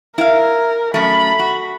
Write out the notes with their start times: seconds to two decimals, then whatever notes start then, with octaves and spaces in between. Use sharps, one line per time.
0.18 E4 A#4 F5
0.94 F#2 A3 B5
1.39 F#4